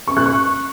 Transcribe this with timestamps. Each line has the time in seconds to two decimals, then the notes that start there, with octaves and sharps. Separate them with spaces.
0.07 C#6
0.17 F#6
0.26 C#6